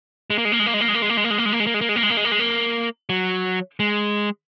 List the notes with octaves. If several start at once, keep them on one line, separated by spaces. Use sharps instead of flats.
G#3
A#3
G#3
A#3
G#3
A#3
G#3
A#3
G#3
A#3
G#3
A#3
G#3
A#3
G#3
A#3
G#3
A#3
G#3
A#3
G#3
A#3
G#3
A#3
G#3
A#3
G#3
A#3
G#3
A#3
F#3
G#3